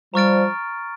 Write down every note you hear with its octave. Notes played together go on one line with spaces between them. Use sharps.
F3 G3 A#5 C#6 F6 A6 D7